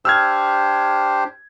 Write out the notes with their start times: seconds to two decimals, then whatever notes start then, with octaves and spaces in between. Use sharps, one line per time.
0.05 D4 G4 C5 E6 F6 G#6